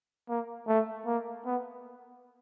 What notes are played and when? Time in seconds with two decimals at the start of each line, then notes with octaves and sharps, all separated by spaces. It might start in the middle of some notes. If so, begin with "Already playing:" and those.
0.29 A#3
0.68 A3
1.06 A#3
1.45 B3